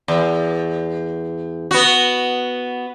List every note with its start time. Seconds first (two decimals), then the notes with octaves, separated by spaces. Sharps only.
0.08 E2
1.71 B3 F#4